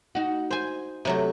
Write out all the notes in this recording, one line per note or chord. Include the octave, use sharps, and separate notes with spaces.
D#4 F#4
C5 G#5
C3 F#3 A3